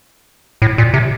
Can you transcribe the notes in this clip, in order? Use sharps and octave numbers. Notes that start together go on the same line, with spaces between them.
A2
A#2
C3